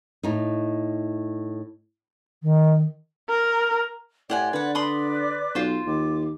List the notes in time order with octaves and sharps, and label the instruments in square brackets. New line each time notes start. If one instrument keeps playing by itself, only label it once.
[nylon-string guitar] A2 D#4
[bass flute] D#3
[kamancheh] A#4
[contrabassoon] A2 [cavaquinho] G4 F#5 G#5 [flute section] D5 C6 G#6
[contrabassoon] D3 [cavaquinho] B4 F#5
[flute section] B4 D5 D6 [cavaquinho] B5 C6 D#6
[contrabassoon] B1 [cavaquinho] F4 C5
[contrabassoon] D#2 [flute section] D6